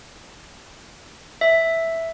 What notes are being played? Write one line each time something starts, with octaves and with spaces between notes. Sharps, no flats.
E5